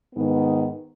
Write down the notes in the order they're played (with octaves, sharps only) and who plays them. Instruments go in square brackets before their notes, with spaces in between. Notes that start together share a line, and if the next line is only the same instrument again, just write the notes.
[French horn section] G#2 D#3 B3